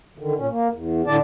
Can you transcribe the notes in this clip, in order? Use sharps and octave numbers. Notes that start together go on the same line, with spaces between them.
D3 D#3
A#2 C#4
A#3
E2
A2 D3 D5 A5